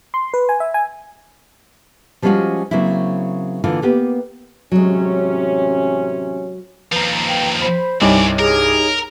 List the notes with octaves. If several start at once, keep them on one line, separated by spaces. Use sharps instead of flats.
C6
B4
G#5
E5
G#5
F3 G3 G#3 C#4 F4 F#4
C#3 F#3 A#3 C4 E4
D3 E3 A#3 F4
A#3 B3 G4
A1 C3 F#3 G#3 C#4
D#2 F3 B4 A#5
G5
C5 B5
C2 G2 C4 D#4 G4 C#5 D5 G#5
G#4 A#4